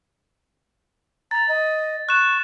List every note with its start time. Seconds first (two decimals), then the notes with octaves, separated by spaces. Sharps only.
1.31 A#5 A6
1.49 D#5
2.09 C#6 F#6 E7